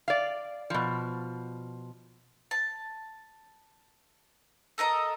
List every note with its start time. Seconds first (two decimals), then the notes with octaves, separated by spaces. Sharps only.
0.08 D5 F5
0.70 B2 F3
2.51 A5
4.78 A4 A#4 D#5 A#5